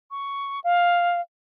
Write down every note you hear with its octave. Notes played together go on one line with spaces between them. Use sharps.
C#6
F5